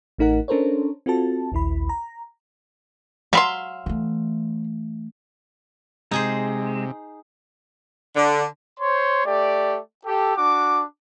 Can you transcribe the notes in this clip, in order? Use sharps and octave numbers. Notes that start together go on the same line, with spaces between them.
A1 A3 D#4 A#4 F#5
C#4 D4 A4 A#4 C5 C#5
C4 F4 F#4 A4 A5
A#1 D#2 E4 B5
A#5
F#3 E5 F5 B5 C6
E3 A3
C3 G#3 D#4 G#4 C5
D3
C5 C#5 C6
A3 G4 D5
G4 A4
D4 F#4 D6